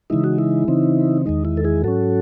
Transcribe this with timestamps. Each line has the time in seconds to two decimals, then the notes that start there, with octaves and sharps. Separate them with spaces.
0.10 C#3 E3 G#3 D#4 E4
0.24 F#4
0.38 E4
0.68 C#3 E3 C4 D#4
1.26 E2 D#3 G#3 D#4
1.45 E4
1.57 A4
1.64 E4 G#4
1.84 G#2 F#3 C#4 F#4 A4